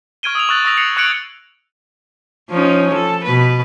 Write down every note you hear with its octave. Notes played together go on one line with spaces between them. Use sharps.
C#6 F6 G#6 D7 D#7 G7
D#6 E6 D7 F7
C#6 E6 F#6 A6 F7 F#7
C#6 D#6 E6 A#6 F7
F#6 C7 C#7 F7
C#6 F#6 G#6 C#7 D7 F#7
F3 C#4 D#4
A4
B2 B4